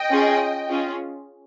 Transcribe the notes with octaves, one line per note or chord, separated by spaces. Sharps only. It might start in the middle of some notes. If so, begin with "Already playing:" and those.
Already playing: D#5 G5
C#4 F4 G#4
C#4 F4 G#4